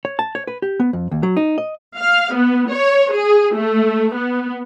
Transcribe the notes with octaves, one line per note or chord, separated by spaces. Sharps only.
C#5
A5
C#5
B4
G4
B3
F2
D#2
F#3
D#4
D#5
F5
B3
C#5
G#4
A3
B3